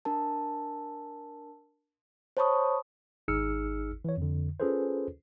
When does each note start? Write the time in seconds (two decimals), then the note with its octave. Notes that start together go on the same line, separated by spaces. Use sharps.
0.05 D4 A#4 A5
2.37 C5 C#5 A5 B5 C#6 D#6
3.28 G#1 D#4 G#4 E6 F6 C#7
4.05 E3 C#5
4.17 F2 D3
4.60 C#4 F4 G#4 A4 B4 C5